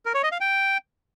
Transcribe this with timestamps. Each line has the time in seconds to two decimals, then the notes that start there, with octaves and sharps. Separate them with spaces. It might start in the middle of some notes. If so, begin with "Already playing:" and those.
0.06 A#4
0.14 C#5
0.23 D#5
0.32 F5
0.41 G5